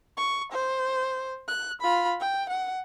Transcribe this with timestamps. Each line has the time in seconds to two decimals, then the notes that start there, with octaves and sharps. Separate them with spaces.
0.17 C#6
0.52 C5
1.48 F#6
1.81 F4 B5
2.20 G5
2.49 F#5